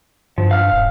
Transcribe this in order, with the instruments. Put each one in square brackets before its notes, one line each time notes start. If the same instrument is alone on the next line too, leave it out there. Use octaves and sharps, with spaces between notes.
[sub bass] G2 [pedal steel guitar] F3
[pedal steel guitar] F5 F6
[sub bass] D#1